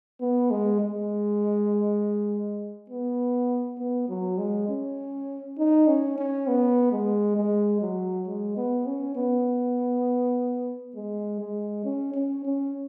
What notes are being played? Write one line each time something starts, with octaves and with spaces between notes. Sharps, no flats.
B3
G#3
G#3
B3
B3
F#3
G#3
C#4
D#4
C#4
C#4
B3
G#3
G#3
F#3
G#3
B3
C#4
B3
G#3
G#3
C#4
C#4
C#4